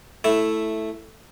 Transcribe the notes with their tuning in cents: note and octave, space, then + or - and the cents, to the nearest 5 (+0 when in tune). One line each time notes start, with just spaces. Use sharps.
A3 +0 E4 +0